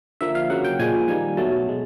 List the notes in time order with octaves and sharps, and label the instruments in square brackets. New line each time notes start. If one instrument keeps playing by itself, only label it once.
[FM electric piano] D3 F3 A#3 E5
F5
C#3 F#3 A#3 F#5
G5
A#2 F3 G#3 G#5
D#3 G3 A#3 G#5
B2 F#3 A3 A5
B2 G#3